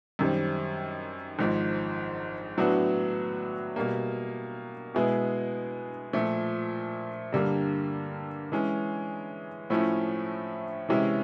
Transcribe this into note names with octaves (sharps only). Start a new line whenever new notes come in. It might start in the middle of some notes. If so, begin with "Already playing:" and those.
F#2 D#3 G3 C4
G#1 G#2 F3
A2 F#3 B3 D4 F#4
B2 G3 A#3
B2 G#3 B3 E4 G#4
A#2 F3 A3
G2 D3 G3 A#3
E3 G#3 C#4
A2 F3 A3 C#4 E4
C3 E3 G#3 C#4 E4